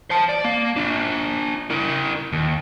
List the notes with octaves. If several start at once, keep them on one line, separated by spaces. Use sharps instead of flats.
C5 A5
D5
A#3
D4 F4
E4 A#4
D#2